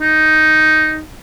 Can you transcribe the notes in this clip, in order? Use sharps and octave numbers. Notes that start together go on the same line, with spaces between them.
D#4